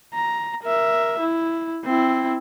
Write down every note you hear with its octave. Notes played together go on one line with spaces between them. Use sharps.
A#5
A#4 E5
E4
C4 E4